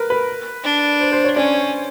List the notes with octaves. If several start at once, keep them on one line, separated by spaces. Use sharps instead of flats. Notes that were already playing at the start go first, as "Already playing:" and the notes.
Already playing: A#4 B4
B4
D4
C5
C5
C#5
C#4 D5